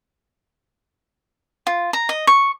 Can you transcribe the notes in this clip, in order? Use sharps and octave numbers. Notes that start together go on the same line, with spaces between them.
F4
A#5
D#5
C#6